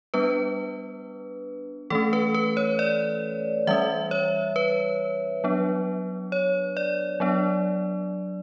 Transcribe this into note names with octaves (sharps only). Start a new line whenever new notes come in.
G3 B3 D4 B4
E3 A3 C#4 A4
B4
B4
C#5
D5
E3 G3 C#4 E5
C#5
B4
F#3 B3 D4
C#5
D5
F#3 B3 D4